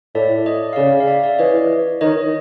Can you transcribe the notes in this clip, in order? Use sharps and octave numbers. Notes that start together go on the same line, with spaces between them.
A2 D5 E5
C#5 D#5
F5
C#3 D5 E5
F5
D5 E5
D5 E5
E3 C#5 D#5
D#3 C#5 D#5